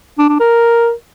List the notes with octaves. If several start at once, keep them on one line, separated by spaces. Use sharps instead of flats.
D4
D4
A#4